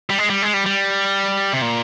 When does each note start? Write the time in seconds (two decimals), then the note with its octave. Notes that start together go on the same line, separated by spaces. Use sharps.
0.10 G3
0.18 G#3
0.30 G3
0.42 G#3
0.54 G3
0.66 G3
1.53 C3
1.62 A#2